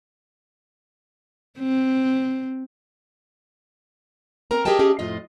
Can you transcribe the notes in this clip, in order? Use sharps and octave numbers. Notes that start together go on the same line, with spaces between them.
C4
C4 A#4 A#5
G4 G#4 A#4 D#5 G5 A5
C#4 G4 G#4 D#5
F2 A2 F4 D#5